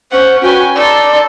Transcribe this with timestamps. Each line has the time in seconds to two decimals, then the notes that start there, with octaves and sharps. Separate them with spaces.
0.12 C#4 C5 F#5
0.42 C#4 F#4 B4 G5 G#5
0.75 D#4 A4 D5 C6